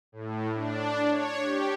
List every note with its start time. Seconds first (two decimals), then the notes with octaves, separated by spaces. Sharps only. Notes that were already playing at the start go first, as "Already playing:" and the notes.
0.12 A2
0.55 D4
1.10 C#5
1.41 G4